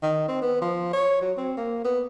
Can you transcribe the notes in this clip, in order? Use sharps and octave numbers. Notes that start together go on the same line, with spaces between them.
D#3
C4
B3
F3
C#5
F#3
C4
A#3
B3